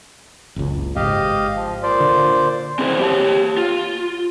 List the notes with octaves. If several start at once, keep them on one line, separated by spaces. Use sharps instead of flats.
F#1 C#2
G#1 G#2 G4 D#5 F5
F3
A#2 C5 D5
D3
C4 E4 G#4 A#4 C5
G4 C#5 A5
F4